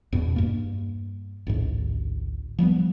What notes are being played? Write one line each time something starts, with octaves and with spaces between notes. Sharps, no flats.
E2 G2 B2
G2 A#3
A1 D2 G#2
F3 G3 A#3 B3